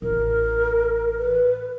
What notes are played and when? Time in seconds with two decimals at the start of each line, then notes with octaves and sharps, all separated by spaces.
0.02 A1 A#4
1.18 B4